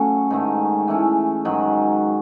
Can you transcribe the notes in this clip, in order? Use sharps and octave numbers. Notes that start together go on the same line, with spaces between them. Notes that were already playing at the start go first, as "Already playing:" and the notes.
Already playing: A2 C#3 F#3 A3 C#4 F#4
G#2 D#3 A3 C#4
E3 A3 C#4
G#2 D#3 F#3